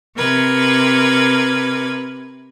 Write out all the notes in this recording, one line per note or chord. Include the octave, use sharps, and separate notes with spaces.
C3 A#4 B4 G#6